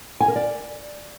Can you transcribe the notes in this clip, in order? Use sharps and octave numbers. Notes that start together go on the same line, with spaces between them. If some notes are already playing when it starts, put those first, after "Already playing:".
G#5
A#4
D5